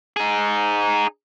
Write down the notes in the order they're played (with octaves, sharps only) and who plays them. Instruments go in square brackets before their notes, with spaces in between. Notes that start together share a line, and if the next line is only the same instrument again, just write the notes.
[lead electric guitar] D#4 G#4